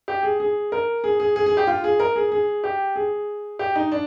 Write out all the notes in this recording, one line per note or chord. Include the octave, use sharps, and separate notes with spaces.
G4
G#4
G#4
A#4
G#4
G#4
G#4
G#4
G4
F4
G#4
A#4
G#4
G#4
G4
G#4
G4
D#4
D4